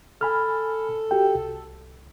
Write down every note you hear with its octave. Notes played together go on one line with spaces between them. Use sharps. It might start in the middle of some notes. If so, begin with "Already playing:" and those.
A4 G#5 B5 F6
F#4 G4 G5
C2